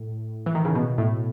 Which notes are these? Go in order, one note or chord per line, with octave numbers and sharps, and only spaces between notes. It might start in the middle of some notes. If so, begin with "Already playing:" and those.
Already playing: A2
E3
D#3
C#3
B2
A2